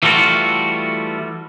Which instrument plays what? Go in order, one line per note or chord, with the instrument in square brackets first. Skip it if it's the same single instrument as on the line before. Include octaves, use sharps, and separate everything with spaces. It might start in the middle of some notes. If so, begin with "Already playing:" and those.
[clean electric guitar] E3 G3 A3 F4 F#4